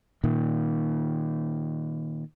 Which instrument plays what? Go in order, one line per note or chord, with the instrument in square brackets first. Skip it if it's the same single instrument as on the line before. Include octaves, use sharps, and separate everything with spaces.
[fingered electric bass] A#2 D#3